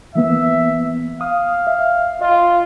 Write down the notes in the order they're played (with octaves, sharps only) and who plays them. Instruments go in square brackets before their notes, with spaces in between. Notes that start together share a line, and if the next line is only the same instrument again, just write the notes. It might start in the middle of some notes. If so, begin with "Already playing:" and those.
[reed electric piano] E3 A#3 B3 [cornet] E5
[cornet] F5 [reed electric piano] D#6
[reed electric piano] E5
[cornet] F4 [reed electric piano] D#5